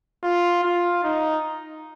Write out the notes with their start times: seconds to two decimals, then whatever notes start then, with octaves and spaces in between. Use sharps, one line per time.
0.23 F4
0.63 F4
1.03 D#4